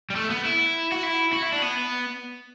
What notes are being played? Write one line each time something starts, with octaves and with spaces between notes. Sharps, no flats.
G3
A3
B3
E4
F#4
E4
F#4
E4
D4
B3